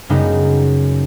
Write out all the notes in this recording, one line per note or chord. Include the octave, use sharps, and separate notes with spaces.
F#2 C#3 G3 G#3 B3 D#4